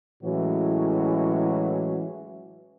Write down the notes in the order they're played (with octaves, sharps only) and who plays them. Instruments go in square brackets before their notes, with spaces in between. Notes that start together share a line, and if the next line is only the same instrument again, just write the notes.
[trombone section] A2 E3 F#3 G#3 C#4 F#4